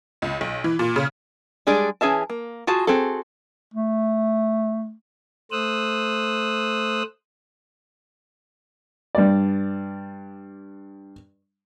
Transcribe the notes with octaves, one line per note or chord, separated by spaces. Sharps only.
C#2
B1
E3
A#2
C#3
G3 G#3 D4 G#4 D5
E3 C#4 G#4 E5 A5
A#3
F4 F#4 G#4 A5
C4 F#4 G#4 A4
A3
A3 C5 D#6 E6 F#6
G2 D5